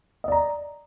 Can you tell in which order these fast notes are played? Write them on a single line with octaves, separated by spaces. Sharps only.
D#5 D5 A#5